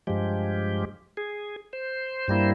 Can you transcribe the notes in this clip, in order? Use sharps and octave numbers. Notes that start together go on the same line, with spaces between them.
G2 F3 G#3 G4
G#4
C5
G2 G3 A#3 E4